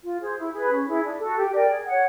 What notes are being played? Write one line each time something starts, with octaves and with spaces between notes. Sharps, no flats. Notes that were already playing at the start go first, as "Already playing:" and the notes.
F4
G#4 C5
E4
G#4 B4
C#4
E4 G#4
D4
F#4 A4
G4
A#4 D5 G5
G#4
C#5 F#5